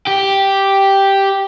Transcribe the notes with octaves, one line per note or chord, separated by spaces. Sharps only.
G4